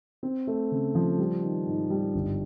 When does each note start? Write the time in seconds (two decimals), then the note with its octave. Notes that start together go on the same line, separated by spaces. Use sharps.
0.23 C4
0.47 A3
0.71 C#3
0.95 F3
1.19 G3
1.42 D#3
1.67 G#2
1.90 G3
2.14 G1